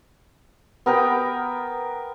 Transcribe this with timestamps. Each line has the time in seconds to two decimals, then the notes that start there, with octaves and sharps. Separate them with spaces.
0.86 B3 A#4 B4 G5